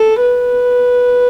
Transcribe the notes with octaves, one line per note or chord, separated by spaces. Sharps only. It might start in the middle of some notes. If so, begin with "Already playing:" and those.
Already playing: A4
B4